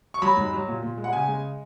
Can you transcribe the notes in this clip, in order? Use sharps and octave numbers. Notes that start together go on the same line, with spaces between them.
C#6
F#3 B5
G#2
F#3
A#2
A#2
G#3
F#5
C#3 G#5
G#3